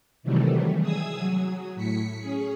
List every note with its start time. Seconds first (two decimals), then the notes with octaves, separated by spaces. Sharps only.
0.23 C3 D#3 E3 F#3 G3 A3
0.80 G#4 D#6 E6 G#6
1.17 F#3
1.75 A2 B6 C#7
2.19 C#4 G#4